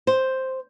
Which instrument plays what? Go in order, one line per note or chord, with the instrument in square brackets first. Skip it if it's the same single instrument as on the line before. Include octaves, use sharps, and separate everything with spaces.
[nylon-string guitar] C5